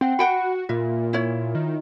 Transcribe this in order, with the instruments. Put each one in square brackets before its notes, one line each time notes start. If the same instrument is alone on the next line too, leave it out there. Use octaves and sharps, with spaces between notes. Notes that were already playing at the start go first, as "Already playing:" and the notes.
[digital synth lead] C4 [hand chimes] F#5 G5
[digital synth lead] F#4 [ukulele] F#5 G5 B5 [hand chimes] C#7
[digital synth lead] A#2 [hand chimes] F4 [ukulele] E5
[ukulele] E4 C#5
[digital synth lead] D#3